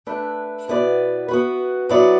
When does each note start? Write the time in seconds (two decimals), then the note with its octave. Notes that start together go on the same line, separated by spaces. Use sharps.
0.07 A3 D4 B4 E5
0.68 B2 B3 E4 B4 D5
1.28 B3 F#4 B4
1.89 F#3 B3 E4 D5